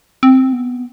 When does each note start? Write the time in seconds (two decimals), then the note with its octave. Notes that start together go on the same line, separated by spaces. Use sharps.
0.23 C4
0.53 B3